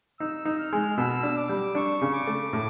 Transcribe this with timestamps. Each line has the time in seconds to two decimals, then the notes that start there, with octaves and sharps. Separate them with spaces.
0.20 D#4 E6
0.45 D#4
0.59 F6
0.73 G#3
0.97 B2 E6
1.23 D4
1.37 D6
1.49 G3
1.75 D4 C#6
2.02 C#3
2.14 D6
2.27 A3
2.53 A2